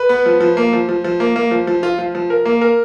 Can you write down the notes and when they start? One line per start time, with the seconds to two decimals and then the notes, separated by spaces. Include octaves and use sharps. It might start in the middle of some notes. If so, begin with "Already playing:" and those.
Already playing: B4
0.09 B3
0.26 F3
0.41 F3
0.57 A#3
0.73 F3
0.89 F3
1.04 F3
1.20 A#3
1.36 A#3
1.51 F3
1.67 F3
1.83 F4
1.98 F3
2.15 F3
2.30 A#4
2.45 A#3
2.61 A#4